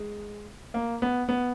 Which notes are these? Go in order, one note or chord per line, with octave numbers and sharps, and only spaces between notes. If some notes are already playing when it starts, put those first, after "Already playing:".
Already playing: G#3
A#3
B3
B3